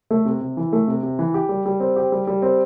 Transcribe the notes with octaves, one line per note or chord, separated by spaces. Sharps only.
A3
C3
C3
E3
A3
C3
C3
E3
G4
G3
G3
C4
G4
G3
G3
C4